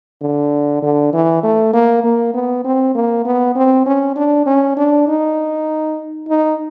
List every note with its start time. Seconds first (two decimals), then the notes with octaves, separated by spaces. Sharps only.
0.21 D3
0.82 D3
1.13 E3
1.43 A3
1.73 A#3
2.04 A#3
2.34 B3
2.65 C4
2.95 A#3
3.25 B3
3.56 C4
3.86 C#4
4.16 D4
4.46 C#4
4.77 D4
5.08 D#4
6.28 D#4